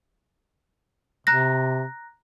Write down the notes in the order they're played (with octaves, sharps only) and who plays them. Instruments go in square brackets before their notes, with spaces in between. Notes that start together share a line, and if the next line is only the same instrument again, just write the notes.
[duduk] C3 [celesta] A#5 F#6 A#6